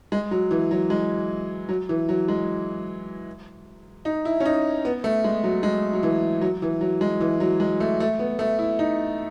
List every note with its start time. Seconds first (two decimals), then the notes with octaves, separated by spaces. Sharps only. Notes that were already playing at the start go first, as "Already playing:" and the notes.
0.12 G#3
0.31 F#3
0.51 E3
0.71 F#3
0.90 G#3
1.69 F#3
1.89 E3
2.09 F#3
2.28 G#3
4.05 D#4
4.25 E4
4.40 C#4
4.45 D#4
4.85 B3
5.04 A3
5.24 G#3
5.44 F#3
5.63 G#3
5.93 F#3
6.03 E3
6.41 F#3
6.62 E3
6.81 F#3
7.01 G#3
7.21 E3
7.40 F#3
7.60 G#3
7.80 A3
8.00 A3
8.19 B3
8.39 A3
8.59 E4
8.79 D#4